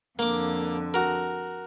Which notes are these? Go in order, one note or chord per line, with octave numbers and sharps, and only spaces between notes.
F2 D3 A#3 D6
F#4 A#4